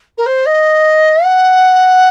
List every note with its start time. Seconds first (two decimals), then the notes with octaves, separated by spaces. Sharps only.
0.18 A#4
0.26 C5
0.46 D#5
1.24 F#5